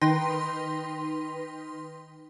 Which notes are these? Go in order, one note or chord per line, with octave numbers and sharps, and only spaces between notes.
D#3 D#4 B4 G5 C6 A#6